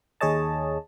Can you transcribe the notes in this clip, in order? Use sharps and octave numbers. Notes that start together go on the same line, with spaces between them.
D#2 G#4 C#5 D#5 A5